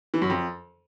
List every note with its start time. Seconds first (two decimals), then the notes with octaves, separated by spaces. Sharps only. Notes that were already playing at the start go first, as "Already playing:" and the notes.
0.14 E3
0.22 F#2
0.30 F2